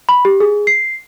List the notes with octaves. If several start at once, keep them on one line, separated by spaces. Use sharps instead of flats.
B5
G4
G#4
C7